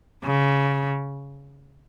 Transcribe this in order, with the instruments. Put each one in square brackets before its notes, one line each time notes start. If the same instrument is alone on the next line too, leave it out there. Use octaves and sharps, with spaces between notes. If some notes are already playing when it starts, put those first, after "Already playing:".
[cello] C#3